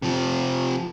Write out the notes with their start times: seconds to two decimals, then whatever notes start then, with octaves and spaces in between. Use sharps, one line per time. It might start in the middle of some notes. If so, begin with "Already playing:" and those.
0.02 C3 F3